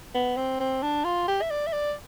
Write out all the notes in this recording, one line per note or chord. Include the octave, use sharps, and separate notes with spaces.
B3
C4
C4
D4
F4
G4
E5
D5
E5
D5